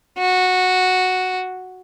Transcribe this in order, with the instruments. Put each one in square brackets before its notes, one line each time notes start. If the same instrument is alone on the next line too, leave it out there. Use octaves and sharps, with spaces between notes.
[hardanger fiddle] F#4